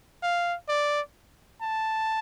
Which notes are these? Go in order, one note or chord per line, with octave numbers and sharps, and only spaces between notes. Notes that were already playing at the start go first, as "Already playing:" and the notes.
F5
D5
A5